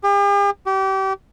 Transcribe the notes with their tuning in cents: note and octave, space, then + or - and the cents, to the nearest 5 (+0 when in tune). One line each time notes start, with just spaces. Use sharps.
G4 +45
G4 -30